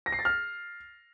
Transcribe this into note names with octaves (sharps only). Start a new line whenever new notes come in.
A#6
C7
A6
F6